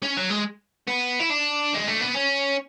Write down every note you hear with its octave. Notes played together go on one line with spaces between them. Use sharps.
C#4
F#3
G#3
B3
E4
D4
G#3
A3
B3
C#4